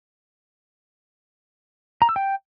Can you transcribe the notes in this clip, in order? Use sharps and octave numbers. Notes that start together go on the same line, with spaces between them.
A#5
E6
G5